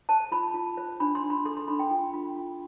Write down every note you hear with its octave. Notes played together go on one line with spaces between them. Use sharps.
C5 A5
F4 B5
F4
C5
D4 B5
C6
D4
B5
A4 C6
C6
D4 B5
G5
F4
F4
F4